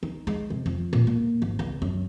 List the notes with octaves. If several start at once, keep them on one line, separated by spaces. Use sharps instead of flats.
D#4
G#3
C3
F2
A#2
A#3
G#1
C#2
F#2